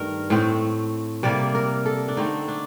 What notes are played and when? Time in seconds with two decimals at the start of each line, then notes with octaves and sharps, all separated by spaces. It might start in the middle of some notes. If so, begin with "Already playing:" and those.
Already playing: G2 D#3 A3 A#4
0.30 A2 A3 C4
1.23 C3 G3 A#3 D5
1.55 A#4
1.86 A4
2.08 D4
2.17 D3 A3 C4 D#4
2.48 D4